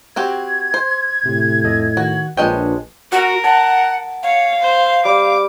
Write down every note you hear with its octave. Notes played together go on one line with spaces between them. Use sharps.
C4 F#4 G4 G#6
C5
A2 C3
F2 A4 D#5
D#3 F#4
A#1 G#3 D4 F4 B4 C#5 D#5 G5
F#4 A#4 F#5
F#5 A5
C#5 F5
C5
G3 D6